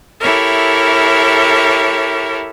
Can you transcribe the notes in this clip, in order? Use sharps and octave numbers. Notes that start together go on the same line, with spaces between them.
E4 G4 A4 A#4 C#5 E5